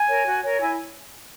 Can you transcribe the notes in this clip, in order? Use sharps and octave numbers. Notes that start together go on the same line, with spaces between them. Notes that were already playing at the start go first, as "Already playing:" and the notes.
Already playing: G#5
A#4 C#5
F#4
A#4 C#5
E4 G#5